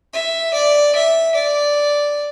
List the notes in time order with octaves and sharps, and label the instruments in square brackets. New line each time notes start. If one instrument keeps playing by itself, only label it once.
[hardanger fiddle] E5
D5
E5
D5